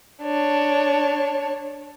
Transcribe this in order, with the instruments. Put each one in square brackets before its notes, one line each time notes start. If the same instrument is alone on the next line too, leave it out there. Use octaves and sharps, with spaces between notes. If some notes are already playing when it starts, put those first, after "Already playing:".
[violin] D4 C#5